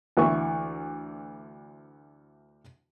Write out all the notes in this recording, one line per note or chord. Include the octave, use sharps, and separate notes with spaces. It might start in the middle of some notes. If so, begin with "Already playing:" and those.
D2 E3 C#6